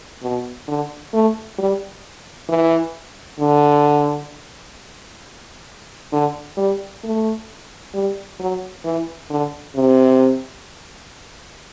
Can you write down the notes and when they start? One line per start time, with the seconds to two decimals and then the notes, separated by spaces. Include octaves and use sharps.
0.22 B2
0.68 D3
1.13 A3
1.58 G3
2.49 E3
3.40 D3
6.12 D3
6.57 G3
7.03 A3
7.94 G3
8.39 F#3
8.84 E3
9.30 D3
9.75 C3